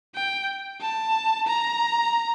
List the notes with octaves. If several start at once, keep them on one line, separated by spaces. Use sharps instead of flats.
G5
A5
A#5